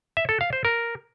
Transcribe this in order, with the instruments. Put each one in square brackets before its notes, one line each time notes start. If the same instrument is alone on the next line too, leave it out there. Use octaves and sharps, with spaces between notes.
[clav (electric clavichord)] E5
A4
F5
C5
A#4